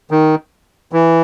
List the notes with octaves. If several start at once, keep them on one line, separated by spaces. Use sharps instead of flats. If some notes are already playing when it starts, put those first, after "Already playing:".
D#3
E3